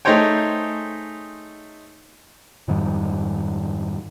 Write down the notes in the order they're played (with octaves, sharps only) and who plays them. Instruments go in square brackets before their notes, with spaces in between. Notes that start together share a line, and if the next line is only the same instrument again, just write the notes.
[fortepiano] A3 D#4 G#4 C5 C#5 G5
[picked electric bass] F2 G#2 D#3 G3